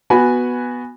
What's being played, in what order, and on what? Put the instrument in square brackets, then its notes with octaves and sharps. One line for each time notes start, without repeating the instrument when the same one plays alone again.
[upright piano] B3 F#4 G#5 B5